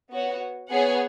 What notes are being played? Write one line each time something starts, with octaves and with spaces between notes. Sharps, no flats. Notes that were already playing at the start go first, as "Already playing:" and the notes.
B3 F#4 C#5
B3 G#4 C#5 F#5